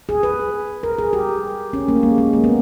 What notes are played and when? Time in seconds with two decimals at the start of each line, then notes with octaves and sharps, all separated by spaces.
0.09 G#4
0.23 B4
0.83 A#4
0.98 G#4
1.13 G4
1.73 C#4
1.88 A#3
2.03 G#3
2.18 G#3
2.33 A#3
2.44 B3